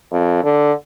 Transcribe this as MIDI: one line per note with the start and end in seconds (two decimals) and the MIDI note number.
0.12 0.41 41
0.44 0.73 50